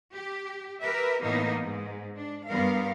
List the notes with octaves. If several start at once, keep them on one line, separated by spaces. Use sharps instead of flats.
G4
G4 A#4 B4 E5
A2 E3 A#3 B3 D#4
G#2
D4
G2 B3 A#4 F5